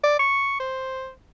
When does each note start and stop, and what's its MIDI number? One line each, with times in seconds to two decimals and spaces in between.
0.03 0.19 74
0.19 0.55 85
0.60 1.10 72